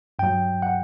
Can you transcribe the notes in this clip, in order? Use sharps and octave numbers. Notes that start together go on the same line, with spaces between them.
G2 F#3 G5
F#5